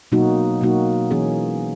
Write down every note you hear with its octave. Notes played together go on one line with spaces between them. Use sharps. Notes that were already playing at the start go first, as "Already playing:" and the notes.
B2 F#3 A#3 D#4 F#4
B2 F#3 A#3 D#4 F#4
E3 A#3 C#4 G#4